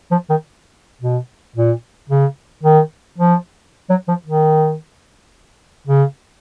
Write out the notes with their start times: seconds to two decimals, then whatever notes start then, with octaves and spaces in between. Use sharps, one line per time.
0.11 F3
0.29 D#3
1.01 B2
1.56 A#2
2.09 C#3
2.63 D#3
3.18 F3
3.90 F#3
4.08 F3
4.26 D#3
5.87 C#3